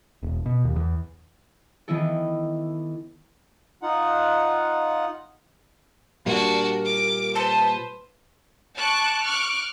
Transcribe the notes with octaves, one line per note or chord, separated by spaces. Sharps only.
E1
B2
D#2
E2
D#3 E3 B3 E4 A4
D#4 F4 F#5
A#2 G3 D4 F#4 A#4
D6
B4 C5 A5
A5 C#6 D6 F#6
C#6 D6 F6 F#6